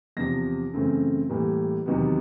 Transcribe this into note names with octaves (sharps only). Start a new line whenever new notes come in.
E2 C3 F3 A#6
F#2 C#3 E3 A3 C4
A2 E3 G3 A#3
E2 C3 D#3 F#3 B3